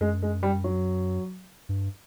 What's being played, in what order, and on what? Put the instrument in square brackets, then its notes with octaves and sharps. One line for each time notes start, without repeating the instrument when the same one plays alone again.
[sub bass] F#2 [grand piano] G#3
[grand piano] G#3
G3
F#3
[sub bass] G2